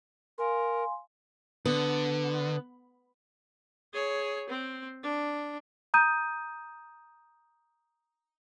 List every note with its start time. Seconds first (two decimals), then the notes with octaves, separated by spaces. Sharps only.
0.38 A#4 F5 G#5 C6
1.65 D3 B3
3.94 G#4 C#5
4.50 C4
5.03 D4
5.94 A#5 D#6 G6 D#7